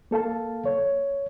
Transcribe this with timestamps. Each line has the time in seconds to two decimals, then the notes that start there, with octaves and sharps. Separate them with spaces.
0.11 A#3 A4 F5 A5
0.66 C#5